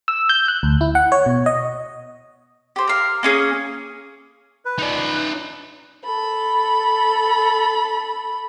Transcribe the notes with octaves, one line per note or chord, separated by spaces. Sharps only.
E6
G6
F#6
D2
E4
F#5
C#5
B2
D#5
G4 C5
A#4 F5
A#3 C#4 G#4
B4
D#4 D5
A4 B5